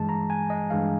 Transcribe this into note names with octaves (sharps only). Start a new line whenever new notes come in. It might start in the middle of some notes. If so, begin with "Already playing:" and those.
Already playing: G2 E3 G#3 A5
A#5
G#5
D#5
G2 E3 G#3 F5